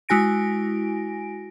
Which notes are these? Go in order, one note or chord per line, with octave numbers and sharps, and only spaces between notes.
G#3 E4 F#4 G#5 A#6 D7